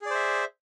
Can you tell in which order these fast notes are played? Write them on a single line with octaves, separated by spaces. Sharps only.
G#4 D5 C5 E5